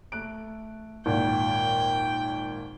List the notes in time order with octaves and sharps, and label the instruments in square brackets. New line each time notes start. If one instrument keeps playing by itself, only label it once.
[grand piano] A3 F#6 D7
[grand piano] G#1 D#2 A#2 [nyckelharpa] G5